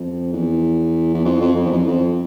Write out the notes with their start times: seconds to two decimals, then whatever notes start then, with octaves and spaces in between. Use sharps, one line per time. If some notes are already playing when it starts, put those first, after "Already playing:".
Already playing: F2
0.33 E2
1.14 E2
1.25 F2
1.41 F2
1.56 F2
1.66 E2
1.73 F2
1.88 F2